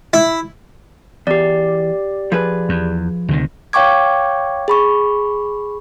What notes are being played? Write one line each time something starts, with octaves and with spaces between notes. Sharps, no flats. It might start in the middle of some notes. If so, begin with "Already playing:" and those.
E4
E2 G4 D5
F3 G#4 B4
E2
D2 C3 D#3
C#5 F5 G5 C#6 D6 G#6
G#4 B5 C#6